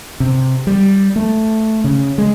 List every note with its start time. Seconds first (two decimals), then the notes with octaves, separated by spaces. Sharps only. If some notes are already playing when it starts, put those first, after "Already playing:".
0.20 C3
0.67 G3
1.16 A3
1.84 C#3
2.18 G#3